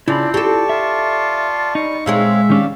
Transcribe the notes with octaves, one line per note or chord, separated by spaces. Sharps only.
C#3 C4 D4 E4 F4 D5 B5
G4 A4 D5 A5 C#6
F4 E5
G3 D#4 C#6
A#2 G#3 C4 G#4 C#5 E5 F5
D#3 C#4 D4 G4 F5